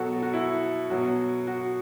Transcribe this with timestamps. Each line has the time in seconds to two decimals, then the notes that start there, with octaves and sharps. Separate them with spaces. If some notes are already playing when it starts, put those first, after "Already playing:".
Already playing: B2 F#3 F#4 A4
0.23 F#4
0.33 E4
0.90 B2 F#3 F#4
1.47 F#4